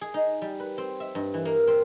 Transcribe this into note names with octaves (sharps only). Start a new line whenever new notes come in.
G#4
D#4
G3
B4
C4
E5
G2
E3
A#3
C4